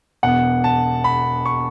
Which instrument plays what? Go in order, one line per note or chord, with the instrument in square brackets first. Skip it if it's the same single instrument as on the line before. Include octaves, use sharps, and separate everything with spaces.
[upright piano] E1 E2 B2 B3 [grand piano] F#5
[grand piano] A5
B5
C#6